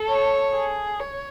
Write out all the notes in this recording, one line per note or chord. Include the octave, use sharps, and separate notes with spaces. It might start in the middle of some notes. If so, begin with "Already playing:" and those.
Already playing: A4
C#5
G#4
C#5